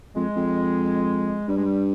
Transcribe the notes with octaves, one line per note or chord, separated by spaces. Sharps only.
F2 G#3
F2
G2 G3
G#3
G3